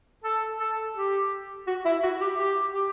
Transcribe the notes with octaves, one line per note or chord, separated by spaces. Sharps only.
A4
A4
G4
F#4
E4
F#4
G4
G4
G4